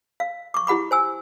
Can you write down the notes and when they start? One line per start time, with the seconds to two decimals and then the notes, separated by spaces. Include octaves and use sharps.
0.20 F5
0.54 C#6 D6
0.67 E4 G4 F#5 B5 D6
0.91 C5 G#5 E6